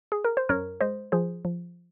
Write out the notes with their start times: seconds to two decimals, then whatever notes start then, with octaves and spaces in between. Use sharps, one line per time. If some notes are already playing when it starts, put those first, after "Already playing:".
0.12 G#4
0.25 A#4
0.37 C5
0.49 F#2 A#4 C#5
0.81 G#3 C5 D#5
1.12 F3 G#4 C5
1.45 F3